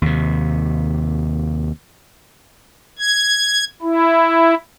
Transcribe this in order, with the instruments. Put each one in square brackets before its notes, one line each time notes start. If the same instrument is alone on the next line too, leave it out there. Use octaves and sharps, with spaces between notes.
[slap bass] D#2 C3
[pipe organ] G#6
E4